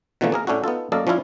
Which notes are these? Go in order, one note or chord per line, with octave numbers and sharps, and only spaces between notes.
B2 D3 E3 F3 A3 A#3
A#3 G#4 A#4
A2 C#4 D4 E4 F#4
B3 D#4 F4 A4
F#2 A#3 A4 D5 D#5 F5
F3 C#4 D4 E4 F4